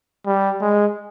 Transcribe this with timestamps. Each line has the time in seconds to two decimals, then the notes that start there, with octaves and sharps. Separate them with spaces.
0.26 G3
0.61 G#3